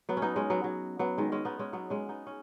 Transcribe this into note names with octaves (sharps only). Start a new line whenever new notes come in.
F#3 B3
C#4
B3 D#4
G#3 C#4
F#3 B3
F#3
F#3 B3
D#3 G#3
G#3 C#4
B3 D#4
G#3 C#4
F#3 B3
G#3 C#4
B3 D#4
C#4